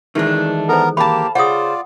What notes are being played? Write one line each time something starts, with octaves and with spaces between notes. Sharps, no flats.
D#3 E3 G#3 A3 D4
B3 A4 A#4 C5 A#5
A#3 G4 F5 A5 B5
C#3 F4 C5 D5 F#5 D#6